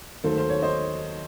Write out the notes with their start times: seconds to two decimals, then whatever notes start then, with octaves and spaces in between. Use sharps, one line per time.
0.24 D#2 D#3 F#3 A3 A4 C5
0.37 C5
0.50 C#5
0.62 C5 D#5